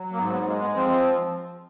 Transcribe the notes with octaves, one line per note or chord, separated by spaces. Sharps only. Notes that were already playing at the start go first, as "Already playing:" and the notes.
Already playing: F#3
A#3
G#2 B3
B3
G#3 A#3
B3
F3 C4